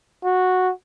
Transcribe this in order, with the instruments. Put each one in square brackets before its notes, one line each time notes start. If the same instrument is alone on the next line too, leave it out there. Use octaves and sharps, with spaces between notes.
[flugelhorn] F#4